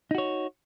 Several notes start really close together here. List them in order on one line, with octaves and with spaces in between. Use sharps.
D#4 F#4 C#5